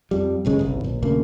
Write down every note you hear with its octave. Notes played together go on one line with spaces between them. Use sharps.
F2 G3
F#1 B1 C#3 G#3
G1 C2
A#1
D#1 D2 C#3 A#3